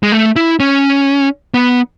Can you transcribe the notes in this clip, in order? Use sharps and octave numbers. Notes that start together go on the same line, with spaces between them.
G#3
A3
E4
C#4
B3